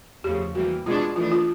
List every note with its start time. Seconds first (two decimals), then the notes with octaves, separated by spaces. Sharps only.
0.24 E2 C#3 F3 A3 G4
0.55 E3 G3 A#3 F#4
0.86 B2 G#3 B3 D4 F4
1.16 E3 A3 D4 F4
1.31 F4